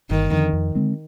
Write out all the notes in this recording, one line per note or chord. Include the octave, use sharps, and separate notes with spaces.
G1 D#3
F2 D3
F2
D3 G#3 C4